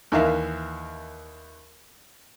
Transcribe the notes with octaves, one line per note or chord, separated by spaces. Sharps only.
D#2 E3 A#4 E5 F5